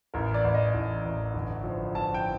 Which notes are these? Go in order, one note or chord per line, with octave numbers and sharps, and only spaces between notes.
A1 A#4
D5
A1
D#5
A1
A1
G1
F3
F3 A5
G5